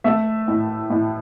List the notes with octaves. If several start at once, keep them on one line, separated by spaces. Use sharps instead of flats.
A3 E5
A2
A2